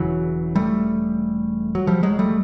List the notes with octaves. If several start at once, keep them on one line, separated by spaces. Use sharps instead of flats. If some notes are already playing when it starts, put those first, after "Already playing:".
Already playing: E1 E2 C#3 E3 F#3
G3 A3
F#3
F3 G3
F#3 G#3
G3 A3